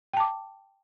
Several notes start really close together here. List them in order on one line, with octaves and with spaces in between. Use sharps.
G5 A5 D6